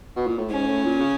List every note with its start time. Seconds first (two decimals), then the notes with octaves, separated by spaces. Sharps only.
0.16 B2
0.27 A#2
0.38 A2
0.50 G#2 C#4
0.66 A2
0.84 A#2
1.00 C#3